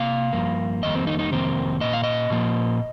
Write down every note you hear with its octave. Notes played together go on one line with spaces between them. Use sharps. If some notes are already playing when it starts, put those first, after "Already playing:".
Already playing: C3 A#3 F5
G2 F3 A#3
F2 D#3 G3 A#3 D#5
C4
D#4
D#4
F2 C3 D#3 A#3 C4
A#2 A#3 D#5
F5
D#5
A#2 F3 A#3